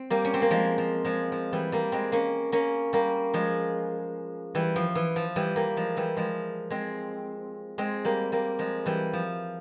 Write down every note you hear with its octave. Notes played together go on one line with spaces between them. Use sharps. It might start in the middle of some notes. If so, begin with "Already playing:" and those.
Already playing: C4
G3 A#3
C#4
C4
A#3
F3 G#3
F3
F3 G#3
F3
E3 G3
G3 A#3
G#3 C4
A#3 C#4
A#3 C#4
G3 A#3
F3 G#3
E3 G3
F3
E3
F3
E3 G3
G3 A#3
F3 G#3
E3 G3
F3 G#3
G#3 C4
G#3 C4
G3 A#3
G3 A#3
F3 G#3
E3 G3
F3